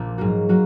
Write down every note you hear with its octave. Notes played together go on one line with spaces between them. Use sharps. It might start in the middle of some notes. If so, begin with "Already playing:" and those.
Already playing: A#1 A#2
G#2 F#3 A#3 F#4
F#3 A#3 F#4